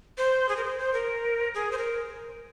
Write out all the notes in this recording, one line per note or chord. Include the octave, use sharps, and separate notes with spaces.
C5
G#4
A#4
C5
C5
A#4
G#4
C5
A#4